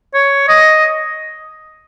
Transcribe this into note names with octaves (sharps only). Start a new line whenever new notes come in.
C#5
D#5